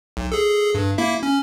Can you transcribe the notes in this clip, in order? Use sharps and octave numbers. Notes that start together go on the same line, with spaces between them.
B1
G#4 A4
G2
A#3 E4 E5
C#4